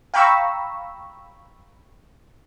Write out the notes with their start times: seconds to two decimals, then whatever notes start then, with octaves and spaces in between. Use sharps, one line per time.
0.14 F5 G5 A#5 B5 C#6 E6